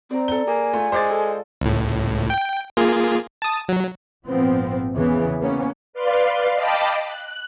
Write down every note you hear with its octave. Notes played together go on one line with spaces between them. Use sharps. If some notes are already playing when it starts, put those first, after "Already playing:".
C4 D5 A#5
A4 A#5 G7
A#3 G#4 G#5
A3 F4
G#3 C5 D6 A6
A4
C#2 A2
G5
A#3 F4 G#4
A5 D#6
F#3
G#1 A#2 F3 B3 C4
E2 C#3 E3 B3
A#3 B3 C#4
B4 D5 F5 C6
D#5 F5 G5 A5 B5 D6
F#6